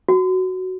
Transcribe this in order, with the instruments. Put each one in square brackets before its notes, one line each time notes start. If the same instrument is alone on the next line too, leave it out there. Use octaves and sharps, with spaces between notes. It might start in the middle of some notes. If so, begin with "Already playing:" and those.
[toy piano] F#4